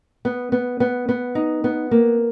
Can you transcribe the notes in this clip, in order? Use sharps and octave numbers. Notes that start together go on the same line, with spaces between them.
B3
B3
B3
B3
D#4
B3
A#3